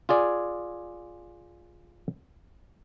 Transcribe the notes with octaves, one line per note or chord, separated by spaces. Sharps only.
F4 G#4 D5 G#5